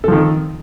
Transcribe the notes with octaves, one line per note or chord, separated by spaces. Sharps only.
D#3 F3 A4